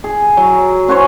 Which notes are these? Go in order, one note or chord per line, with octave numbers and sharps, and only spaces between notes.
G#4
F#3
C#4 F#4 C5 C#5